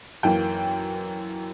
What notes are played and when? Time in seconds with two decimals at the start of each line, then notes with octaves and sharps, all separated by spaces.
0.23 F#2 E3 A#3 G5